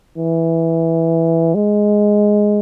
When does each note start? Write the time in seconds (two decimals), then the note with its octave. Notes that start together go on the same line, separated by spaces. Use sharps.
0.18 E3
1.54 G#3